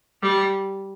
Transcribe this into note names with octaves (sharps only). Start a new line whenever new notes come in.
G3